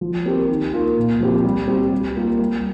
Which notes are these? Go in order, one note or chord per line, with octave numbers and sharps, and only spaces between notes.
F3
C4 G4 A#4
D#3
A#3 F4 A#4
A#2
F3 C4 G4
G3
C4 G4
G3
A#3 F4 A#4
G3